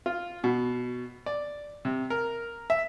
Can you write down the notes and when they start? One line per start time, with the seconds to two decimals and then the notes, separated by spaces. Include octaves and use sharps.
0.06 F4
0.44 B2
1.26 D5
1.85 C3
2.10 A#4
2.70 E5